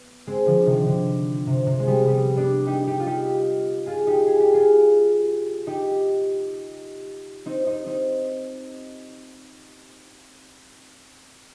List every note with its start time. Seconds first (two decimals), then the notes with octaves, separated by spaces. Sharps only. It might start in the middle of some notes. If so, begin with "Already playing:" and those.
Already playing: B3
0.27 G#3 C4
0.46 D3 F3
0.66 C3 D#3
0.86 D3
1.47 C3
1.67 C3
1.79 G#3
1.87 G3 B3
2.07 G3 B3
2.36 B3 D4
2.67 D#4 G4
2.87 D#4 G4
3.00 F4
3.06 D#4 G4
3.86 F4 G#4
4.07 D#4 G4
4.27 G#4
4.40 G4
4.54 F4 G#4
5.67 D#4 G4
7.46 C4 D#4
7.67 C4 D#4
7.86 C4 D#4